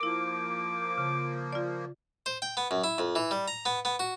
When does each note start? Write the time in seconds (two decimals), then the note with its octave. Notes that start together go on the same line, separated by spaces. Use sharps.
0.01 F3 A#3 E4 A#4 D6
0.98 C#3
1.53 F4 D5
2.26 C5
2.42 G5
2.57 B3
2.71 F#2
2.84 E4
2.98 F2
3.16 E3
3.31 G3
3.48 A#5
3.66 B3
3.85 B3
3.99 F#4